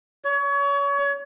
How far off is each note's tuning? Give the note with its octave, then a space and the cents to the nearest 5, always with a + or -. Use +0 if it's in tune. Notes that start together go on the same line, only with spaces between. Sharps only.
C#5 +30